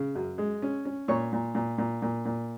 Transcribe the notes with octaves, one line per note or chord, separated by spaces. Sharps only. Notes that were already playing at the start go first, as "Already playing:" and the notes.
Already playing: C#3
F#2
G#3
C#4
C#4
A#2 C#5 C#6
A#2
A#2
A#2
A#2
A#2